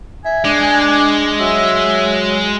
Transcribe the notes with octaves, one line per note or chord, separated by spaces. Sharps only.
E5 G#5
G#3 D4
F#3 E5